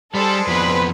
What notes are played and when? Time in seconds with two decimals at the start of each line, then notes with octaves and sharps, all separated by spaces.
0.15 G3 G#3 D4 A4 C5
0.48 F2 B3 B4